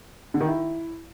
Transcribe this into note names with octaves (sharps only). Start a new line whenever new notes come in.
D3
D#3
E4